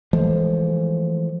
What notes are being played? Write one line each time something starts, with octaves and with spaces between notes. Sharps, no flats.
E3 F3 G#3 A3